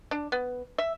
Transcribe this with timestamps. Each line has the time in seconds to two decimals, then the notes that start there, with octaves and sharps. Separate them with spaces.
0.11 D4
0.32 B3
0.78 E5